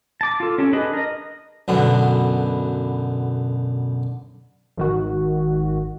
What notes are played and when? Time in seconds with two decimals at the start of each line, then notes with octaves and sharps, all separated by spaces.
0.21 A5 D6
0.40 F4 A4
0.58 C#4 G4 A4
0.73 D4 G#4 A4 B4 D#5
0.93 A#4 D#5
1.68 B1 F#2 D3 B3
4.78 G#1 D#3 F#4